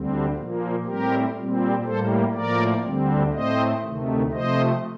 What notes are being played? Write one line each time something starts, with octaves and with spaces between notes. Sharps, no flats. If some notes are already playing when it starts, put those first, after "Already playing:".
Already playing: D2 D3 G3 C4
A#2 F3 A#3
A2 G3 C4 G4 A#4
A#2 G3 C4
A2 G3 A#3 A4 C5
A2 F3 A#3 A#4 D5
D2 D3 G3 C4
A2 A3 C4 C5 D#5
D2 C3 D#3 A3
C3 F3 A3 C5 D#5